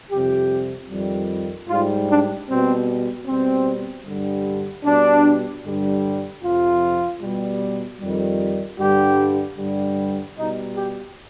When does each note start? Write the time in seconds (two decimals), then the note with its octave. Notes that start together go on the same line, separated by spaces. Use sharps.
0.10 F2 C3 G3 G4
0.90 F2 D#3 G3
1.68 G#2 G3 F4
2.08 D4
2.47 B2 G3 C4
3.27 B2 G3 C4
4.06 G2 D3 G3
4.84 B2 G3 D4
5.63 G2 D3 G3
6.41 F2 C3 F3 F4
7.20 B2 G3
8.00 F2 D#3 G3
8.79 G2 D3 G3 G4
9.57 G2 D3 G3
10.37 B2 G3 D#4
10.75 G4